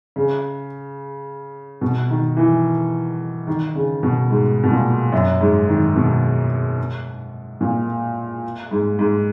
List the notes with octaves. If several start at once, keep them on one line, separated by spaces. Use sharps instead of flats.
C#3
B2
D#3
E3
D#3
C#3
B2
G#2
B2
A#2
F#2
G#2
D#3
B2
A#2
G#2
G#2